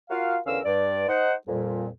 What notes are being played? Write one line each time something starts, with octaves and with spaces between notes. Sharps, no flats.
F4 F#4 A#4 F5
E2 D3 C#4 A#4 F5 E6
G2 D5
D#4 C5 F#5
F2 A#2 G3